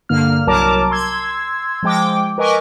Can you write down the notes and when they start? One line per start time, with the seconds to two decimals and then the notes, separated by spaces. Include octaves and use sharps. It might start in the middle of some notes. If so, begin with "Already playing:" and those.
0.09 G2 D3 A#3 F6
0.47 C2 F#3 A#4 A5 A#5 D6
0.91 C6 E6 G#6
1.83 F3 G#3 G5 D6
2.38 A#4 B4 D#5 G#5 C#6 D6